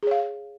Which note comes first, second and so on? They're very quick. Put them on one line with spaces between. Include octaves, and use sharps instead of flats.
G#4 C#5 F5